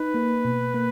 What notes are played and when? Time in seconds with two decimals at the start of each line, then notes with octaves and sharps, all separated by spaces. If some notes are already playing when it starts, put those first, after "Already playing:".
Already playing: D#4 B4
0.14 A#3
0.45 B2
0.74 A#3